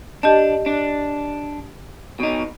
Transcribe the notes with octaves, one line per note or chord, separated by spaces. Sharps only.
D4 G4 D#5 A5
D4
B2 D#4